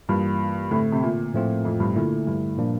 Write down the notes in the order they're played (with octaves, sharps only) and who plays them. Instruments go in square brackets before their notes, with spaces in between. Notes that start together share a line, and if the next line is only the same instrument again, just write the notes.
[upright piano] G2 [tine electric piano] E3 A#3 F4
[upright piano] A2 [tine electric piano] D3 A3 C4
[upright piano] C3
A#2
[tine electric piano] A2 F3 A3 C4 F4
[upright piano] F2
G2
[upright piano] A#2 [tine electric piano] D3 A3 E4
[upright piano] G2
[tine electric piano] A#2 F3 A#3 D4